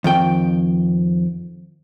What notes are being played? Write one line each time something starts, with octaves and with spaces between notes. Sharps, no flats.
F2 D#3 G5